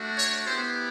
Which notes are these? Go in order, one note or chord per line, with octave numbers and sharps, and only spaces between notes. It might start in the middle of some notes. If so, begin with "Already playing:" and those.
Already playing: A3 D4 F#4
C#5
B3 E4 G4 C5